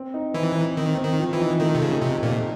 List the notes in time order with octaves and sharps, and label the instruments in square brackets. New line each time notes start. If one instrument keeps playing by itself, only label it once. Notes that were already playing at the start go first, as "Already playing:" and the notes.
Already playing: [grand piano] C4
D#4
[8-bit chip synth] E3 [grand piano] C4
[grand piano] D#4
[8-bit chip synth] D#3 [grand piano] C4
[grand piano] C4
[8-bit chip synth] D#3
[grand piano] F3
[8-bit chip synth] E3
[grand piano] D#4
[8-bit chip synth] D#3 [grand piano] A3
[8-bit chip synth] C3
[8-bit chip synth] C#3 [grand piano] A3
[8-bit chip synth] C3 [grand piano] D#4
[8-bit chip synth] A#2 [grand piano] A3